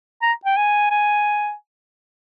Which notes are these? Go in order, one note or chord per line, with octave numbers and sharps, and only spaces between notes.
A#5
G5
G#5
G#5